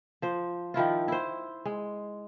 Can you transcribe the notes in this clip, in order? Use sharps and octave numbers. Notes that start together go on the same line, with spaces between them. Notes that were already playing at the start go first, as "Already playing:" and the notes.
F3 C5
D#3 F3 E4 F4
E4 C5
G#3